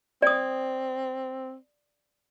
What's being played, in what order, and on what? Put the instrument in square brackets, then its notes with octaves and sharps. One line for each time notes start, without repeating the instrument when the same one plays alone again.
[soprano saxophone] C4 [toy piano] D5 D#6